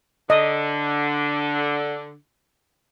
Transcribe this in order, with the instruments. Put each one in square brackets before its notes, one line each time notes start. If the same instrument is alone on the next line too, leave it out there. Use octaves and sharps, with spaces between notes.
[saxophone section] D3 [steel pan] D#5